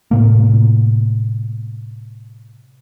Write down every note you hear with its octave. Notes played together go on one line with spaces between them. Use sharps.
A2 C3 A#3